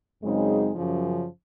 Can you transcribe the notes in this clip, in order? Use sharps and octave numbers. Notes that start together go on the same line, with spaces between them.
F#2 C#3 G#3 C4 D#4
F#2 C#3 F3